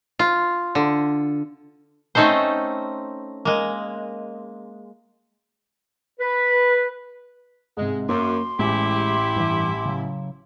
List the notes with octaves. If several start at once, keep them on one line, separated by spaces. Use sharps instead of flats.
F4
D3
A3 C4 C#4 D#4 A4 C5
G#3 A#3
B4
G#2 C3 G#3
F#2 A#3 C6 D6
A1 G#3 E4 G4
G2 E3
C#3 F#3